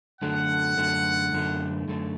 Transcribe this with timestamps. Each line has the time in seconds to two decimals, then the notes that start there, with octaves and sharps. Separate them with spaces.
0.22 F#2 D3 A3 F#5
0.77 F#2 D3 A3
1.33 F#2 D3 A3
1.88 F#2 D3 A3